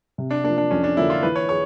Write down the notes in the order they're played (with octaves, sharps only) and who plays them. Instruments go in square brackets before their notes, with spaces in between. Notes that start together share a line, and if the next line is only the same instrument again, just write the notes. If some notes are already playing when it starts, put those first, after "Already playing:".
[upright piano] C3
[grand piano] D4
[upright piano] F3 A#3 [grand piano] D4
[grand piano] D4
[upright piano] F2 [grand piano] C#4
[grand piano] D4
[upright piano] D3 F3 A#3 C#4 [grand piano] E4
[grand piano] F4
[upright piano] E3 [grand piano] B4
[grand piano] C#5
[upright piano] G#4 [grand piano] C#5